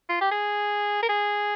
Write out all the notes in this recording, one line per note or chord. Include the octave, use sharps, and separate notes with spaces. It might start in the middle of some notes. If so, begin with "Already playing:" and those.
F4
G4
G#4
A#4
G#4